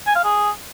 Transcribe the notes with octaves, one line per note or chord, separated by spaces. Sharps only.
G#5
F5
G#4